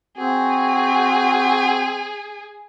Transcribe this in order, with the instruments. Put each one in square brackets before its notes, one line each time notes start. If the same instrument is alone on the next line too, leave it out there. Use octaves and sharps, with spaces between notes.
[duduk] C4 [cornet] F#4 [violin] G#4